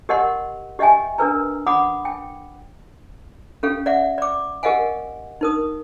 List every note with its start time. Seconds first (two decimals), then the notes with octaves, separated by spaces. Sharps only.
0.09 G4 A#4 D#5 F#5 C6
0.79 G4 D#5 E5 G5 G#5
1.18 D4 A#4 B4 A#5
1.67 F#5 B5 D6 D#6
2.05 G5
3.63 C#4 G4 A4 F5
3.86 D5 E5 F#5
4.18 D5 D6
4.63 G4 A#4 D#5 F5 F#5 G#5
5.41 D#4 A#4 D#6